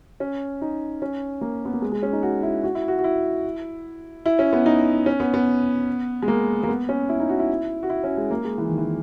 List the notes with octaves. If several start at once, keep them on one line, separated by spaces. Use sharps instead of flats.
C#4
D#4
C#4
A#3
B3
A#3
G#3
G#3
C#4
D#4
F#4
E4
F#4
E4
F#4
F#4
E4
E4
C#4
B3
D#4
C#4
B3
B3
G#3
A#3
A#3
B3
C#4
E4
D#4
F#4
E4
F#4
E4
C#4
G#3
A#3
G#3
E3
D#3
E3